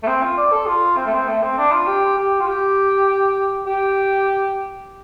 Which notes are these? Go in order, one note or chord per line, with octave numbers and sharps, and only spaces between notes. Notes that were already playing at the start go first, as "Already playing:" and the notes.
A3
C4
F4
D5
A4
F4
C4
A3
C4
A3
C4
D4
F4
G4
G4
F4
G4
G4